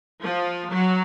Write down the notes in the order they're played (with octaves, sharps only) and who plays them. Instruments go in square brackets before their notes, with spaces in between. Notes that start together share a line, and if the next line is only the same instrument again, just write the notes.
[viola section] F3
F#3